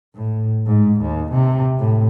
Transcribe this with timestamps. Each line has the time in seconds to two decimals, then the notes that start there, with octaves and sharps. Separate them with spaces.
0.15 A2
0.66 G#2
1.01 D#2
1.32 C3
1.79 A2